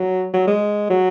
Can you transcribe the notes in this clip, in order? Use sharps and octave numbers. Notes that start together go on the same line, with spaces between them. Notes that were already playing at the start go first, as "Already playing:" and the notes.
Already playing: F#3
F#3
G#3
F#3